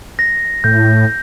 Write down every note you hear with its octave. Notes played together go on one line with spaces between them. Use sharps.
A#6
A2 G6